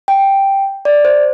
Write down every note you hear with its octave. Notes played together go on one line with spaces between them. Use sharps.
G5
D5
C5